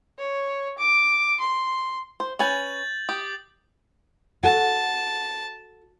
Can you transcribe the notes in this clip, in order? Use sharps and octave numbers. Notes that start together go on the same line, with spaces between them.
C#5
D6
C6
C5
C#4 B4 G#5 G6 A6 F#7
G4 D#6
F#4 A4 F#5 A5